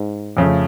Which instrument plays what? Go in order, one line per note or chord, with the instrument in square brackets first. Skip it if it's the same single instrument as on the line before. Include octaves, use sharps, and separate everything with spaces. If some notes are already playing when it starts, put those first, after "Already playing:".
Already playing: [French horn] G#2
[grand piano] F2 C#3 F3 A3